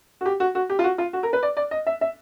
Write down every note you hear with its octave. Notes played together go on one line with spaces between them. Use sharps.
F#4
G4
F#4
F#4
G4
F4
F#4
F4
F#4
A#4
B4
D5
D5
D#5
E5
E5